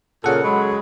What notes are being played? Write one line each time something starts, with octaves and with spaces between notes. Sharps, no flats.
A#2 C#3 A4 A#4 F#5
C#3 F#3 G#3 B5